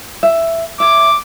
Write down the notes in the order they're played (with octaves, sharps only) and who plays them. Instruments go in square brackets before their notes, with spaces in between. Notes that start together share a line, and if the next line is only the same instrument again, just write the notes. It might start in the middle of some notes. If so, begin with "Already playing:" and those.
[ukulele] E5
[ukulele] C#5 E5 [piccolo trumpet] D6